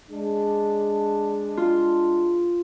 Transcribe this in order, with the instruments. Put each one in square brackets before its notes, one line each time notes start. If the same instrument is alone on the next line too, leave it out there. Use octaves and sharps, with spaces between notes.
[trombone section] G#3 D4
[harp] F4